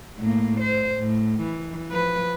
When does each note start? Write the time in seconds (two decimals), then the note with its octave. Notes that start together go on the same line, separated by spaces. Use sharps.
0.19 A2 A#3
0.60 C5
1.00 A2
1.42 E3
1.89 F3 B4